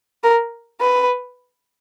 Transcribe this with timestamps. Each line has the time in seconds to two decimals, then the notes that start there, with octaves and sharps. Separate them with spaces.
0.24 A#4
0.80 B4